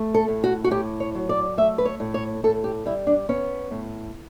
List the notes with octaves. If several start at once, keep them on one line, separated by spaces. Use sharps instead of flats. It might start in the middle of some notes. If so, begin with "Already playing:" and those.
Already playing: A3
A4
A2
F#4
F#4
A2 G4
C#5
F#3
D5
A3 E5
B4
C#5
A2
C#5
A2 A4
G4
G3 E4
D4
B3 C#4
A2